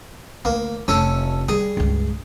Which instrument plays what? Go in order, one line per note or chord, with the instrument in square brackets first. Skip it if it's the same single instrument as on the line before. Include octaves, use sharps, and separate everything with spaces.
[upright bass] D2 [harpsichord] A#3
[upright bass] F1 [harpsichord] C#4 A4
[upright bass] G3 [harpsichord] G#4
[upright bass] C#2 G2